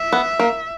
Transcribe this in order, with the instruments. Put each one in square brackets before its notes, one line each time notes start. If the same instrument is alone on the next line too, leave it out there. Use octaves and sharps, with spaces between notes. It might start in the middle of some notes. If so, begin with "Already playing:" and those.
Already playing: [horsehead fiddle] E5
[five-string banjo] B3
A#3